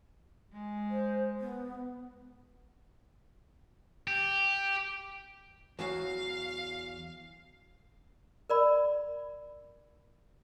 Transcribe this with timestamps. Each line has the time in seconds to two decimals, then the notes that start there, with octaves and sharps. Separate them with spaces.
0.53 G#3
0.90 C5
1.40 B3
4.07 G4
5.79 E2 F#3 F5
8.50 A#4 D5 B5